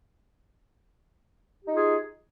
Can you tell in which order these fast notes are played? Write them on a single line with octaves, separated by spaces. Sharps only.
G4 D#4 F4 G#4